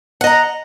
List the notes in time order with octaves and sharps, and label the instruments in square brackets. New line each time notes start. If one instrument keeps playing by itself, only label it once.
[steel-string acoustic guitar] F#5
D#5
A#5